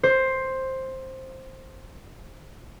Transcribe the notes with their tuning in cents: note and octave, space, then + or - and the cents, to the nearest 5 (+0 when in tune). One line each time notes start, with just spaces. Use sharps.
C5 +10